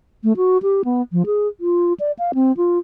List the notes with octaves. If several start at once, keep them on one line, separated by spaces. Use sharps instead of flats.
A3
F#4
G4
B3
F3
G#4
F4
D5
F5
C4
F4